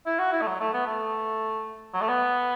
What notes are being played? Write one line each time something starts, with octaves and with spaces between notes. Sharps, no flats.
E4
F#4
E4
A3
F#3
A3
B3
A3
F#3
A3
B3